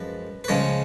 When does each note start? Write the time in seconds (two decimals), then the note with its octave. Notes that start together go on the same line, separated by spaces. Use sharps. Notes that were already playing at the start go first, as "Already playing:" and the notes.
Already playing: F#2 F3 G#3 B4
0.44 B4
0.48 C#2 C#3 F3 G#3 C#4 C#5